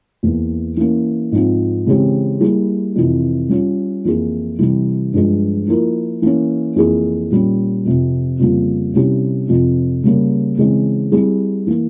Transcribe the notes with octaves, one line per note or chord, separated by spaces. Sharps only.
E2 E3 A#3
E3 A#3 C#4
G#2 F3 C4 F4
C#3 E3 G#3 C4 G4
G3 A#3 E4 G#4
F2 C3 E3
G3 C#4 F4
F2 E3 A#3 E4 G#4
C3 E3 G3
G2 F3 G#3
F3 A#3 E4 A#4
E3 A#3 C#4
F2 E3 A#3 E4 G#4
A#2 G3 C#4
F2 C3 F3
F2 C#3 G3 A#3 F4
C3 G3 C#4 E4 G4
F2 C3 F3
C#3 G3 A#3
C#3 E3 G#3 C4
G3 C4 E4 G#4
E3 A#3